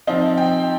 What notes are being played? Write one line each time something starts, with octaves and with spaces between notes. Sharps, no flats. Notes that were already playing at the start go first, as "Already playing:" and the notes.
F3 C4 D#4 F5
G5